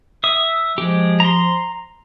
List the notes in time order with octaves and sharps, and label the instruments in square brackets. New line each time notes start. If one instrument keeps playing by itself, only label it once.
[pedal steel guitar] E5 D#6
[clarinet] F3 [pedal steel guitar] G#3 G4
[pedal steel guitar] A#5 C6